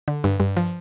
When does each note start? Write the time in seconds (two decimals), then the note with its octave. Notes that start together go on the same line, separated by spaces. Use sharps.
0.08 D3
0.24 G2
0.40 G2
0.57 F3